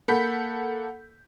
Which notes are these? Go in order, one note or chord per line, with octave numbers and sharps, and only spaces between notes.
A#3 A4 F#5 B5 G6 B6